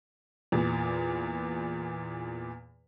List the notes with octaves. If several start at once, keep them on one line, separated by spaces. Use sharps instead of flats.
E2 A#2